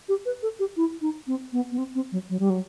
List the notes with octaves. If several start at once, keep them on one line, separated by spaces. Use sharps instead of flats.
G4
B4
A4
G4
E4
D#4
C4
B3
B3
C4
C4
F#3
F#3
G3
F#3